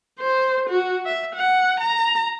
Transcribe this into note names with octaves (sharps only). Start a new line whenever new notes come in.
C5
F#4
E5
F#5
A#5